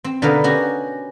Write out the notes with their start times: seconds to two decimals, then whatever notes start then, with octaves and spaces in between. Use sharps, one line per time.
0.04 C4
0.22 B2 D3 D#4 A#4 B4 F5
0.44 C#4 F#4 G4